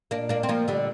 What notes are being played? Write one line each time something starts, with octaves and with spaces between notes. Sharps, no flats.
A#2 A#3 D4
A#3 D4
C4
F3 A#3
D3 G3